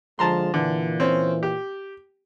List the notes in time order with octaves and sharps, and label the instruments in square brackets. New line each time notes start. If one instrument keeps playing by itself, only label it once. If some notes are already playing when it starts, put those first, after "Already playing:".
[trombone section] D3 F3 G#3 [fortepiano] A5 A#5 C6
[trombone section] A#2 E3 [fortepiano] D3
[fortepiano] C4 C#4
G4